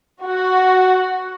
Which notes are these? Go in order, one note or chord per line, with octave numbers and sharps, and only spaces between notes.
F#4